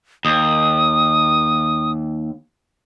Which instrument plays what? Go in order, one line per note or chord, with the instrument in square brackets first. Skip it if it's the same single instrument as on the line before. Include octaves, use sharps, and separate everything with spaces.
[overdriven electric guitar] D#2 [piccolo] D#6